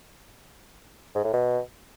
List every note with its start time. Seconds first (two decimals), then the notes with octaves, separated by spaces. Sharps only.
1.15 G#2
1.24 A2
1.33 B2